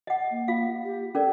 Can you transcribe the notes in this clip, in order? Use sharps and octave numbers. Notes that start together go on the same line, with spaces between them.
D#5 F#5
A#3
F4 F5
G4
C#4 A4 A#4 D5